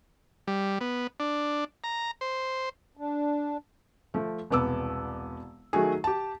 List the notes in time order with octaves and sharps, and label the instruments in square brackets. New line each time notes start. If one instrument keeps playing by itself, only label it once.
[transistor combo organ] G3
B3
D4
A#5
C5
[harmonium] D4
[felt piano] F3 A3
E1 C2 B3 D6 E6
D#3 F#3 A3 F#4 G#4
G4 A5